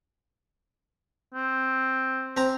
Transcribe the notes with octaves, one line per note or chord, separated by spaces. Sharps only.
C4
C4 A#5